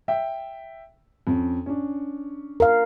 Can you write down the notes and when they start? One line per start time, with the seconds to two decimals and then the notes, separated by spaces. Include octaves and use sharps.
0.08 E5 G5
1.27 F2 C#4
1.66 C#4 D4
2.60 A#4 F5